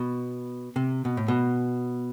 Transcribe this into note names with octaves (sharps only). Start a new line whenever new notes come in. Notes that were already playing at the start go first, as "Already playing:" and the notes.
Already playing: B2
C3
B2
A2
B2